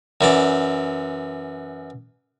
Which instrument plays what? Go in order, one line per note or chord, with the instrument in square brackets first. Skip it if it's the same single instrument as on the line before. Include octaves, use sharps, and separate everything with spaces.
[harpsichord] F#2 E3 D5